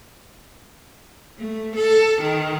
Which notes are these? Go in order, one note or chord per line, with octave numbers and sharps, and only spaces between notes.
A3
A4
D#3